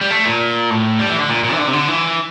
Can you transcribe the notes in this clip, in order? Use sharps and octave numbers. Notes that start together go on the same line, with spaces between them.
G3
A3
A#2
A2
G3
E3
D3
A#2
A#2
E3
D3
C3
D3
E3